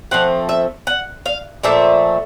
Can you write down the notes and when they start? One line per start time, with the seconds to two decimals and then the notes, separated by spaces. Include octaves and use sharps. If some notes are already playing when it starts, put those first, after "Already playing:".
0.11 F3 A3 C4 F#5
0.49 E5
0.87 F#5
1.26 F5
1.64 A#2 F3 A3 E5